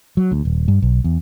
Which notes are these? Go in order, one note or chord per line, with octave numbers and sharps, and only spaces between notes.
F#3
D2
D#1
G2
B1
E2